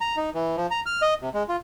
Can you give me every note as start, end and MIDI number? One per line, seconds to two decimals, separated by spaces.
0.01 0.16 82
0.17 0.30 63
0.35 0.56 52
0.57 0.67 53
0.71 0.80 82
0.86 1.01 89
1.02 1.14 75
1.21 1.29 48
1.34 1.43 56
1.49 1.56 65